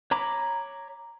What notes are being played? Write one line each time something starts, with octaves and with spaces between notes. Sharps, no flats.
C#5 A#5 B5 D6